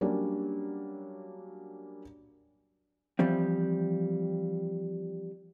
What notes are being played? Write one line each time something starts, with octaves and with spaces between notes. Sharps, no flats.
F#3 G3 A#3 C#4 D4
E3 F3 G3 C4